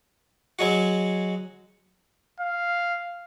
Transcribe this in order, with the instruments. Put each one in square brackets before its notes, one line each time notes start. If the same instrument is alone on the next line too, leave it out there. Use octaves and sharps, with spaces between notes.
[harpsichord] F#3 G#3 F#4
[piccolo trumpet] F5